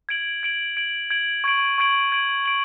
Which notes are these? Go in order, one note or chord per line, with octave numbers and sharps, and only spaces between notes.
G#6 D7 F#7
G#6 D7 F#7
G#6 D7 F#7
G#6 D7 F#7
C#6 G#6 D7 F#7
C#6 G#6 D7 F#7
G#6 D7 F#7
D7 F#7